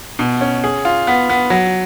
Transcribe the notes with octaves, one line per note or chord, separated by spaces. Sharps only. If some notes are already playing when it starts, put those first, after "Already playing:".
B2
C#4
G#4
F4
B3
B3
F#3